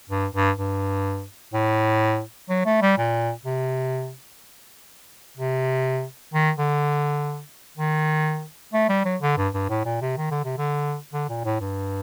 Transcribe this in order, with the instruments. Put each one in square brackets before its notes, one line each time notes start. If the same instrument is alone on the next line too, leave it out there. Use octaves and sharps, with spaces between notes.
[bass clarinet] G2
G2
G2
A2
F#3
A3
G3
A#2
C3
C3
D#3
D3
D#3
A3
G3
F#3
D3
G2
G2
A2
A#2
C3
D#3
D3
C3
D3
D3
A#2
A2
G2